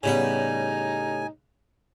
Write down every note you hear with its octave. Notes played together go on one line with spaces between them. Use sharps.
A2 C#3 G3 B3 D#4 B4 G#5